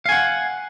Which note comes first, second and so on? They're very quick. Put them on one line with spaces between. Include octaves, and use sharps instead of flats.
F5 G#5 F#5